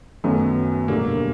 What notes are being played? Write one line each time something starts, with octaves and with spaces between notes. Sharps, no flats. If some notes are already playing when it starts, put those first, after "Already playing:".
F#2 D#3 F#3 A3 B3
E1 D2 D3 G3 A#3